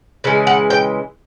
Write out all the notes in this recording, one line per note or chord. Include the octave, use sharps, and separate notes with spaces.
C#3 E3 G#3
F#5
G5